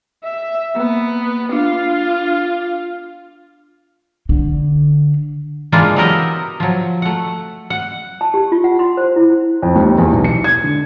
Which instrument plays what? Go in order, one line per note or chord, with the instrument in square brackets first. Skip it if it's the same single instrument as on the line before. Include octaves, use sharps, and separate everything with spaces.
[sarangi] E5
[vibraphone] A#3 [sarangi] B3
[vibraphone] D4 [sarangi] F4
[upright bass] D3
[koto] E3 G#3 A#3 D4 D#4 F4
F#3 B3 G4 A#4 D#5 E5
F3 F#3
A3 F#5
F#5
[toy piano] A5
G4
F4
F#5
C6
C5
E4
[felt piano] F2
D#2
E2
B1
C#7
G#6
D3